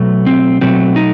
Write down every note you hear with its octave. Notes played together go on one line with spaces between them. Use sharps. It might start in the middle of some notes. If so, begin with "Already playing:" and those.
Already playing: B2 F#3 A3
C4
B2 F#3 A3 C4
D#4